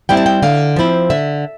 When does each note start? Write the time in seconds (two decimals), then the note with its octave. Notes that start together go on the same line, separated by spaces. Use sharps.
0.09 G3 C4 E4 G5
0.17 A5
0.26 G5
0.43 D3 F5
0.76 F3 C4 E4
1.10 D3 E5